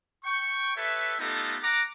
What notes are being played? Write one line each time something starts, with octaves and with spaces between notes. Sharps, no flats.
G5 C#6
G4 A4 B4 C#5 E5
A3 B3 D#4 F4 G4 A4
F#5 A#5 D6